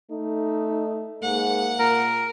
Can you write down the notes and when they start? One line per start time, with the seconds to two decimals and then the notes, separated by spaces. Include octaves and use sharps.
0.11 A3 D#4
1.23 G#2 A#3 F#5
1.79 A#2 A#4